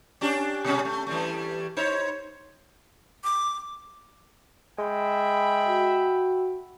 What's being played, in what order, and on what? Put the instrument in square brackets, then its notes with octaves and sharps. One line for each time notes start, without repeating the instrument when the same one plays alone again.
[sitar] C#4 D4 G4
B2 G#3 C#4
A3
E3 G3 A3
D#4 C5 C#5
[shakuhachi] D6
[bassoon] G#3 [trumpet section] E5 G5 B5
[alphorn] F#4